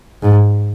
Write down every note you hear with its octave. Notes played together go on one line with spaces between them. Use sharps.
G#2